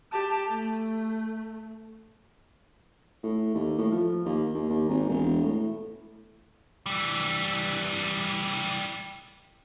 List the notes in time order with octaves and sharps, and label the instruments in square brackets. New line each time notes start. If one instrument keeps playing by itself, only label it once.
[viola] G4 A5
A3
[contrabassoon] A2
D#2
A2
F3
D#2
D#2
D#2
G#1
E1
A2
[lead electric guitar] E3 G3